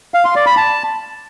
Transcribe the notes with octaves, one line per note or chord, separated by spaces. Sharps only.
F5
C6
D5
B5
A5